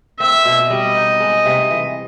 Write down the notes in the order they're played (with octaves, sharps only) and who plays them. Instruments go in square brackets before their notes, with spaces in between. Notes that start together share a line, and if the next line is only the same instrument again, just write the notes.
[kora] C4 [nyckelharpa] E5
[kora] B2
[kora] G3 [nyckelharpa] D#5
[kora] D#4
G#3
C3
E3